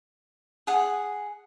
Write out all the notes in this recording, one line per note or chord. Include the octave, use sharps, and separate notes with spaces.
G#4 F#5